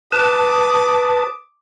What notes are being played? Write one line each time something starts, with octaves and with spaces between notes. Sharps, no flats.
B4 A5 D6 D#6